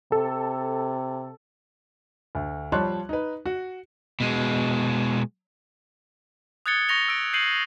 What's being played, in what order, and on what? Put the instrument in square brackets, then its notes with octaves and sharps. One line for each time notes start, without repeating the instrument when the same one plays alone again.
[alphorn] C3 [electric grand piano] A4
[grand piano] D2
F3 G3 C#5 A5 C6 F#6
D#4 B4
F#4
[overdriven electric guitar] B2 G#3
[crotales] D#6 F#6 G#6 A6 C#7 G7
C#6 A6 A#6 F7 G7
E6 D7
G6 C7 D#7 F#7